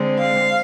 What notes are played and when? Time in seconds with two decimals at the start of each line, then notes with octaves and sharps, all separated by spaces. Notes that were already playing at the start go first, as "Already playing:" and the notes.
Already playing: D3 G#3 C4
0.18 F5